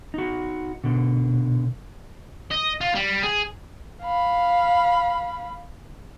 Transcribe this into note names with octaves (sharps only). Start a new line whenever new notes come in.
D#4 F#4
B2 D3
D#5
F4
G3
G#4
F5 B5